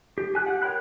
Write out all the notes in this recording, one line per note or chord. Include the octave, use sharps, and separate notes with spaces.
G4
G4 G#5 F#6
G4 F#5
A#4 C#5 G5 B5 F#6